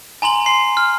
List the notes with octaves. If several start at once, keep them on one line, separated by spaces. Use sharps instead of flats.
G#5 A#5 C6 F#7
C6 C7
F6